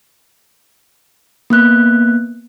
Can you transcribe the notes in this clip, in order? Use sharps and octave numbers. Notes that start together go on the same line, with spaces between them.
A#3 B3 F#6